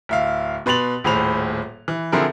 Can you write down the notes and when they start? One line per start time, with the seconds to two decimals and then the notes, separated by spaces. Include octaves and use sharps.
0.09 D1 E5 F5
0.66 B2 B4 C6 A6 F7 F#7
1.04 D#1 A2 G#4 C5 B5 F7
1.88 E3
2.12 D3 F3 C4 E4 G#4 A#4